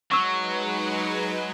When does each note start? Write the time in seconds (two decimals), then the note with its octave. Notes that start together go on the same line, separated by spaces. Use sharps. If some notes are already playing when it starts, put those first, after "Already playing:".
0.12 F#3 G#3 D#4 B4 C#6 E6